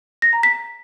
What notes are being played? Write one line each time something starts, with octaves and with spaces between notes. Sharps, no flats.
A#6
A#5
B6